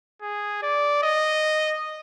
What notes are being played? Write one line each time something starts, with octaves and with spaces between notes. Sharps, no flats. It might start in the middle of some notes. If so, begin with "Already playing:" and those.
G#4
D5
D#5